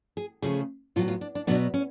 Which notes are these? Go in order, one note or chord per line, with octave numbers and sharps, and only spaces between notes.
G#4
C#3 F3 A3 G#4
A2 F#3 B3 F4
F4
D4
D4
B2 F#3 B3 D4
C#4